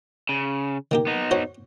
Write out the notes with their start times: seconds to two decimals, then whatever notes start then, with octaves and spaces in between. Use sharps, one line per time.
0.29 C#3
0.91 D#3 A#3 G4
1.07 B3 D#4
1.31 F#4 C5 C#5